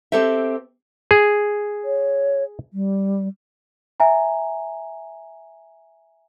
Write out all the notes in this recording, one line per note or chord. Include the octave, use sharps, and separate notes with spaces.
C4 G4 A4 C5 E5
G#4
C#5
G3
E5 G#5 A#5